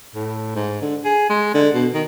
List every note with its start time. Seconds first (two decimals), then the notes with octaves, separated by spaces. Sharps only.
0.15 A2
0.56 G#2
0.82 D3
1.05 G#4
1.30 G#3
1.55 D3
1.74 B2
1.94 D#3